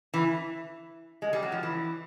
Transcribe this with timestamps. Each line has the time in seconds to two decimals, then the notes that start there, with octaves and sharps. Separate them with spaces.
0.14 E3
1.22 G#3
1.33 G3
1.42 F#3
1.52 F3
1.63 E3